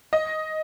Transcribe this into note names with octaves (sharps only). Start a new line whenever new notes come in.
D#5